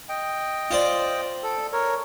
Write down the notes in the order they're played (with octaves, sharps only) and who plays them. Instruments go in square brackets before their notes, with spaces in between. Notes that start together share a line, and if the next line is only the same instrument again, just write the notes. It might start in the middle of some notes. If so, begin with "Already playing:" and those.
[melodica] D#5 G5
[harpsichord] F4 C5 D5
[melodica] A4
A#4 C#5